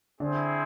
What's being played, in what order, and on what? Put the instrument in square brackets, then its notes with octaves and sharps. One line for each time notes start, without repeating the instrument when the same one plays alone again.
[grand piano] D3 [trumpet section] C4 E4 G#4 C5